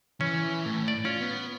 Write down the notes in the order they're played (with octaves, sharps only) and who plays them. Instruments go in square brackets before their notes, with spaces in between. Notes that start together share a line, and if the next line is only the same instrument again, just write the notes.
[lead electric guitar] E3 [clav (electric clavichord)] C#4
[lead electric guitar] A2
[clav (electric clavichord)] D5
[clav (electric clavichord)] C#4 [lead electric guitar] F4
[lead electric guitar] B3